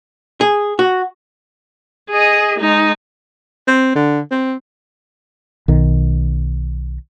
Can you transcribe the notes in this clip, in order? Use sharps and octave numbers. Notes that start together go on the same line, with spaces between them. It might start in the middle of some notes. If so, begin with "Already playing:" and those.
G#4
F#4
G#4 D#5
G#3 D#4
C4
D3
C4
B1 D#3